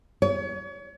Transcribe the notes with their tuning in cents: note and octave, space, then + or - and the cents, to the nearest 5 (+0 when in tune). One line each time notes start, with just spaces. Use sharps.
C#5 +35